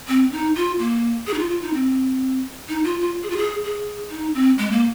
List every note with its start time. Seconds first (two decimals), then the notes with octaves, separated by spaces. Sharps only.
0.08 C4
0.32 D#4
0.56 F4
0.79 A#3
1.27 G#4
1.34 D#4
1.39 F4
1.50 F4
1.62 D#4
1.74 C4
2.69 D#4
2.84 F4
3.00 F4
3.23 G#4
3.30 F4
3.37 G#4
3.64 G#4
4.10 D#4
4.34 C4
4.58 G#3
4.71 A#3